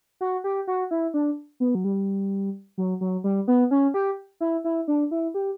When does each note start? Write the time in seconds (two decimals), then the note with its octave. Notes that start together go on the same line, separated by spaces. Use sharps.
0.21 F#4
0.44 G4
0.67 F#4
0.91 E4
1.14 D4
1.60 B3
1.75 F#3
1.84 G3
2.78 F#3
3.01 F#3
3.24 G3
3.48 B3
3.71 C#4
3.94 G4
4.41 E4
4.64 E4
4.88 D4
5.11 E4
5.34 G4